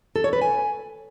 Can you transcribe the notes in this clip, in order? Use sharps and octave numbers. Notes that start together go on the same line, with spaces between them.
A4
C#5
B4
G#5